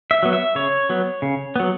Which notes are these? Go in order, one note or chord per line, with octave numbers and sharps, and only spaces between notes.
E5
F#3 B3
E5
C#3 C#5
F#3 B3
C#3
F#3 B3